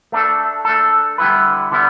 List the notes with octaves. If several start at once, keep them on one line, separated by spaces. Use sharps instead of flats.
A3 D4 A4
A3 D4 A4
D3 G3 B3 E4 B4
D3 G3 B3 E4